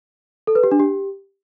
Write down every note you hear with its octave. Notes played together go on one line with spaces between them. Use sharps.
A4
B4
G4
D4
G4